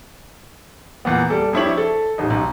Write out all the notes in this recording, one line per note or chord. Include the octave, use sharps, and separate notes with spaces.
E2 A#2 B3
G3 A4 D5
F2 D4 E4 G4 C#5 F#7
A4
D#1 A1 D#4
B1 D#4